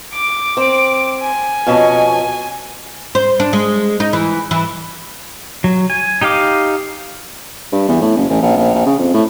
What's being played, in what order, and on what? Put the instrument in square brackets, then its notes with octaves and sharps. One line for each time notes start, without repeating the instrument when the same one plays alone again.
[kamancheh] D6
[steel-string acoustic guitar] C4
[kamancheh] G#5
[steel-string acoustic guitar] F2 B2 C#4
[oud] C5
D4
G#3
D#4
E3
E3
[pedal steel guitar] F#3
G#5
D#4 G4 D#5 F5 D6
[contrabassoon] G2
E2
A2
F#1
A1
A#1
A#1
A#1
C#3
F2
A2